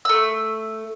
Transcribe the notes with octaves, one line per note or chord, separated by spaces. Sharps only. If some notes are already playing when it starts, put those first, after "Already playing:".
A3 E6